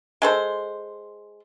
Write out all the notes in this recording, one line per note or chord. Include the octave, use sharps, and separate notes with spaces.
G#3 A4 C5